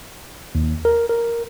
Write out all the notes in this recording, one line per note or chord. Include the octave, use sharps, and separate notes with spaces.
D#2
A#4
A#4